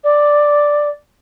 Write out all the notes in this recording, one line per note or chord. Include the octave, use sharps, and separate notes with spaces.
D5